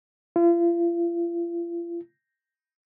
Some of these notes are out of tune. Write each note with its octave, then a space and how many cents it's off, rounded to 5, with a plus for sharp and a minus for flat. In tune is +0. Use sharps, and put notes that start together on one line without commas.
F4 -40